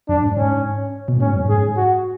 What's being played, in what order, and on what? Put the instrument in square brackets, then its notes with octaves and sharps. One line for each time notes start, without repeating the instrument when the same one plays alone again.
[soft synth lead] F#2 [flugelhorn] D4
[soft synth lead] G#2
[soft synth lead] G#2 [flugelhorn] C#4
[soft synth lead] B2
[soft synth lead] A2 [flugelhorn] C#4
[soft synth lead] G#2
F#2
[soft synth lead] G#2 [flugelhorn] G#4
[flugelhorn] F#4